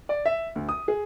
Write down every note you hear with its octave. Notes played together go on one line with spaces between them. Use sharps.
D5
E5
D2
D#6
G#4